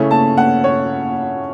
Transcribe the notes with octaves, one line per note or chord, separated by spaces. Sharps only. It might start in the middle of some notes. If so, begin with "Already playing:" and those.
Already playing: C#3 A3 C#4 E4
A5
F#5
C#5